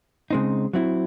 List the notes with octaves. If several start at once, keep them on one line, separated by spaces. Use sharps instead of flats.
C#3 G#3 C4 D#4
F#3 C4 E4